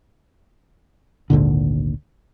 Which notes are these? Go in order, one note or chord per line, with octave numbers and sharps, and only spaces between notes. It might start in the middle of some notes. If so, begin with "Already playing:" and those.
G#1 D2 A#2 D3